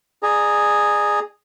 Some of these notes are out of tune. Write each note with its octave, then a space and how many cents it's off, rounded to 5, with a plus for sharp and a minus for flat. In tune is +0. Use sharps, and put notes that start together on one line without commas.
G#4 +0 D5 +30 A#5 +0